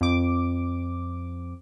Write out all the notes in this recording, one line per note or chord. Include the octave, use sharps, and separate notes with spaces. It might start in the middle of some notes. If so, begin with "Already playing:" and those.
F2 D6